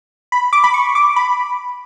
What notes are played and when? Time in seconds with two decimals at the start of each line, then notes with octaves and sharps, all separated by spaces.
0.32 B5
0.53 D6
0.64 B5
0.74 C#6
0.95 D6
1.16 B5